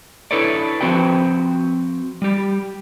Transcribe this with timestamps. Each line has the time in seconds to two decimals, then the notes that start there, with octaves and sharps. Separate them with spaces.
0.31 D4 E4 A4 B4 C#5 D5
0.81 F3 C4 F#4 B4 G5
2.22 G3 G4